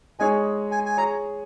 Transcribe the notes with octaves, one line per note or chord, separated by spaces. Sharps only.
G#3 D#4 G#4 C#5 G#5
G#5
G#5
G#4 C#5 A#5